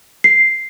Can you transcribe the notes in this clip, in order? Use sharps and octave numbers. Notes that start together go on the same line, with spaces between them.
C7